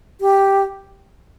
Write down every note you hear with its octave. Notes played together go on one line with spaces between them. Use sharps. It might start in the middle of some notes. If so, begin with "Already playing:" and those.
G4